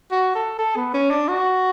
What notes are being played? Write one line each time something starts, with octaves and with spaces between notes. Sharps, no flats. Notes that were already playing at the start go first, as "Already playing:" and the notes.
F#4
A4
A4
B3
C#4
D4
F#4